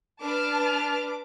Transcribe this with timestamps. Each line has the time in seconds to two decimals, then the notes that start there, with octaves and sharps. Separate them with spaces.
0.22 D4 B4 A5 D6 F6